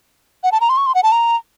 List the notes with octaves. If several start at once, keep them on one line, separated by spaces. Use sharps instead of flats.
F#5
A5
A#5
C6
C#6
C6
F#5
A5
A#5